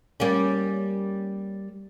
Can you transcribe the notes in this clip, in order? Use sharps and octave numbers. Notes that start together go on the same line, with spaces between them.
G3 A#3 C#4